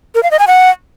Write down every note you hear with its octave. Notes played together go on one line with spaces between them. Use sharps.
A#4
F5
D#5
G#5
F#5